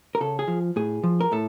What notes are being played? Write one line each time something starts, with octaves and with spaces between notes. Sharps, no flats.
A#4
C#3 A4
G#4
F3
A2 G#4
F3
A#4
A2 A4